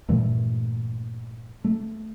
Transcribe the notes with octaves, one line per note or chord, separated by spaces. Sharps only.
G2 A#2 E3 A3
A3